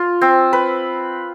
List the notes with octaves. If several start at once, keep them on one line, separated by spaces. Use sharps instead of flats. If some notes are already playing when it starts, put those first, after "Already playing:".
Already playing: F4
C4
B4